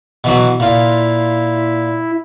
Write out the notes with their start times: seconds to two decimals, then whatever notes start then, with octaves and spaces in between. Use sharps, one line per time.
0.24 B2 E3 F#3
0.60 A#2 E4 F4